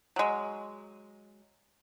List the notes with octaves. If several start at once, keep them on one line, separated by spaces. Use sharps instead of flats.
F#3 G#3